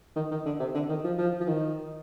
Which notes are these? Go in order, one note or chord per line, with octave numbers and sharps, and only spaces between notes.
D#3
D#3
D3
C3
D3
D#3
F3
F3
F3
D#3